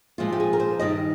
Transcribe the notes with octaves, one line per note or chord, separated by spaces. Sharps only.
A#2 F3 G#3 F4
G4
G#4
A#4
C5
G2 D#3 G3 D#5